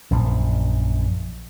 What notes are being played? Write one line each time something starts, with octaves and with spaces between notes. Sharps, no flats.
A#1 F#2 A#2